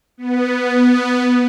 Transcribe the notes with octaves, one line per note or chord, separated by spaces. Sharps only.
B3